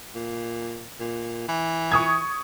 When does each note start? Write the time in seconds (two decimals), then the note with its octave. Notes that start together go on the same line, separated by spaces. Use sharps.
0.15 A#2
1.00 A#2
1.49 E3
1.92 C#6 D#6 G#6